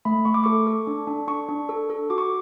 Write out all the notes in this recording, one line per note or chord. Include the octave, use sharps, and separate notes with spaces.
A3 B5
A3 C#6
D6
A4 C#6
A4
D4
D4
D4 C#6
D4
A4
A4
F#4 D6
C#6